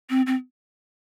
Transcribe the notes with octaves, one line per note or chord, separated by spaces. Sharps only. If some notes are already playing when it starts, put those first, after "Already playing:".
C4
C4